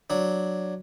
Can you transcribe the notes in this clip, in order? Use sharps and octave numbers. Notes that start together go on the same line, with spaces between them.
F#3 D4